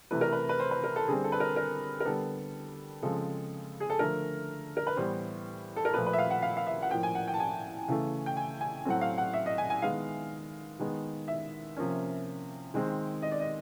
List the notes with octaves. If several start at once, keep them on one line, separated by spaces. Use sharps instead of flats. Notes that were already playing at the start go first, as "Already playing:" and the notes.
C3 E3 A3 B4
A#4
B4
B4
C5
B4
A#4
A4
D3 G3 C4 G#4
A4
B4
A#4
A#4
A#4
D3 G3 B3 A4
C#3 F3 G#3 C4 A4
G#4
A4
D3 F3 A3 A#4
A#4
B4
A2 E3 G3 B3 C5
A4
A#4
A#2 F3 A3 B4
B4
E5
F5
F#5
F5
F5
E5
F#5
A2 F3 A#3 G5
G#5
F#5
G5
A5
G#5
C#3 E3 A3
G5
G#5
G#5
A2 F#3 A3 C4 F#5
F5
F#5
E5
D#5
G#5
G#5
D#3 G#3 B3 F5
D#3 G#3 B3
E5
C3 F3 A#3 C#4
D#3 G#3 C4
D#5
D5
D#5